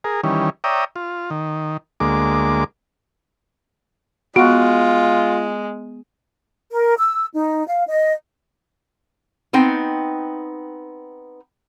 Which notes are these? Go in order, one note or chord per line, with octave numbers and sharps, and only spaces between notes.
G#4 A#4
D#3 E3 G3 C#4
C#5 D5 E5 G5 A#5 D#6
F4
D#3
D2 G#3 A#3 D6
G#3 B3 F4 F#4
A#4
E6
D#4
F5
D#5
B3 C4 D#4 G5